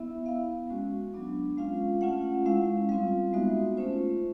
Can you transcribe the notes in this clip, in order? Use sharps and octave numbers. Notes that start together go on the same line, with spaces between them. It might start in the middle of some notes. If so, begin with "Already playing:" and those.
Already playing: B3 E4 E5
B3 E4 F5
G#3 C#4 F#4
F#3 B3 D4
G#3 C#4 F4 F5
A3 C#4 F4 F#5
G#3 C#4 E4 F5
G3 C4 F4 F5
G#3 B3 D#4 F#4 E5
A3 C#4 F4 C5